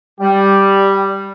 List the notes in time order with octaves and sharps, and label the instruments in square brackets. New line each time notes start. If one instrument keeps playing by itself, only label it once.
[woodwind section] G3 [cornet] G4